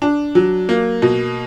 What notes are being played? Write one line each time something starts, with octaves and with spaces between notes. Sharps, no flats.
D4
F#3
A#3
B2